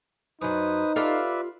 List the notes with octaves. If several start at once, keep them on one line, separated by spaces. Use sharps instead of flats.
F#2 F#3 D#4 B4 C5 D#6
F4 G4 A4 B4 D5 E5